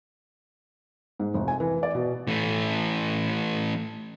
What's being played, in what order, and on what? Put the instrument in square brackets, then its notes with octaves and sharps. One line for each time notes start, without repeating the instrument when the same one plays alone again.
[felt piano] G#2
F1
G#5
E3
D5
B2
[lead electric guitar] E3 A3